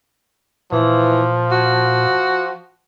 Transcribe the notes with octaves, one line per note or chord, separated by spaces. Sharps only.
A#2 E3 F3
F#4